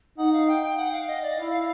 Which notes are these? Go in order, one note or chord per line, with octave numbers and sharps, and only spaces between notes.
D#4 F#5
F5
G5
G5
F#5
F5
D#5
D5
E4 F5
F5